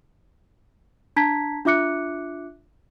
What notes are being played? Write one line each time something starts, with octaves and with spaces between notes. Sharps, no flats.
D4 A5 A#5 G#6 B6
D4 F4 E5 D6 F#6 C#7